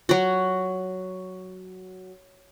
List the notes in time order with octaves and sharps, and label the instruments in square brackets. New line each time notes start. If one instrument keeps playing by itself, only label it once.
[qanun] F#3 F#4